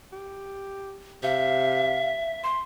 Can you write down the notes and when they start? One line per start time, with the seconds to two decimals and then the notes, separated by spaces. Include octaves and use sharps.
0.12 G4
1.23 C3 E5 F5
2.44 C6